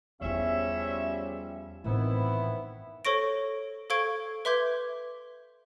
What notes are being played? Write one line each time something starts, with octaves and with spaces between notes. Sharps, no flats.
E2 C#3 F3 G3 C#4 E4 E5
A1 A2 D#3 B3 C4 E4
A4 C5 C#5 C#6 A#6 D7
A4 C5 F5 C#6 G#6 D7
B4 E5 C6 D6 G6 G#6